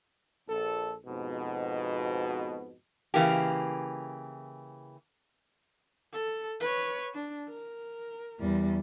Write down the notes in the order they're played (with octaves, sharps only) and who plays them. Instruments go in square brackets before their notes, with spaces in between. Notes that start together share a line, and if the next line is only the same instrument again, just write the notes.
[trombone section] A#1 A4
F2 G#2 B2
[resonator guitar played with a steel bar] C#3 E3 A#3 G4
[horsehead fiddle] A4
B4 C#5
D4
A#4
[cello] E2 G3